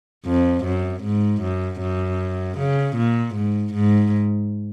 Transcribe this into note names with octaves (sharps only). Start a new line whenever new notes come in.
F2
F#2
G#2
F#2
F#2
C#3
A#2
G#2
G#2